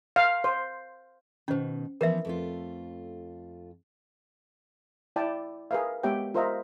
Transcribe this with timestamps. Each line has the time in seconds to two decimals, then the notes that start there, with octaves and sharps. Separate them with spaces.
0.16 F5
0.44 C5
1.48 B2 D#3 C#4 C5
2.01 E3 F3 B3 A#4 B4 E5
2.25 F2 A3 F4
5.16 E4 D5 G5 A5
5.71 G#4 A#4 B4 E5 F5
6.03 G#3 B3 G4 C#5 E5 G5
6.34 F4 A#4 C5 D#5 E5 A#5